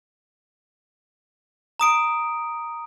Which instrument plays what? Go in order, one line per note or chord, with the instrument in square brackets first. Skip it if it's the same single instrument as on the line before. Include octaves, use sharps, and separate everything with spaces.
[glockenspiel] A#5 D#6 D7